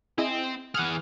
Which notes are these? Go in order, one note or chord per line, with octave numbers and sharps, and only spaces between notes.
C4 E4 G#4 D#5
E3 G#4 F#5 F6